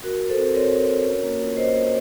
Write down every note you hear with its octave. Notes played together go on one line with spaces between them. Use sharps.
F#4 A#4
F#4
A4 C5
C4
C4 A#4 C#5
F#4
F#4
C#4
A#3
F4
A#3 C5 D#5
A#3